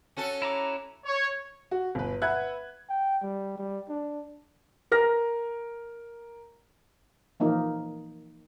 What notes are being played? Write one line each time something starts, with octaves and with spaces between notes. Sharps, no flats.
C#4 F#4 A4
E4 A#5 D6
C#5
F#4
G1 B4
B4 E5 F#5 B5 F#6 G#6
G5
G3
G3
D4
A#4 F6 A#6
E3 F3 A#3 D#4